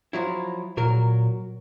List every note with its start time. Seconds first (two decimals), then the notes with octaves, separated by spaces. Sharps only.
0.13 F3 F#3 E4
0.77 A#2 F#3 A#4